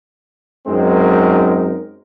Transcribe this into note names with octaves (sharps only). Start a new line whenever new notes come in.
F#2 G#3 C4 D#4 A#4